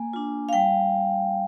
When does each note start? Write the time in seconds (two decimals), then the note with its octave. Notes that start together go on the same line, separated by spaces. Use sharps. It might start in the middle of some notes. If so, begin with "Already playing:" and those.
Already playing: A#3 G#5
0.13 D4 F4
0.49 F5
0.53 G3 G5